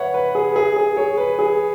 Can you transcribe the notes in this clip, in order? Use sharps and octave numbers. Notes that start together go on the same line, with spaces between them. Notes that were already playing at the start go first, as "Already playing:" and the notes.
Already playing: B4 C#5 E5 F#5
B4
G#4
B4
G#4
G#4
G#4 C#5
B4
G#4